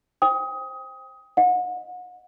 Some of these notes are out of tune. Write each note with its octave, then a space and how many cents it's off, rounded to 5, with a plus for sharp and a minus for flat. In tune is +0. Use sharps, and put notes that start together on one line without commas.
C5 +5 G5 +25 D#6 +20
D#5 +0 F#5 -35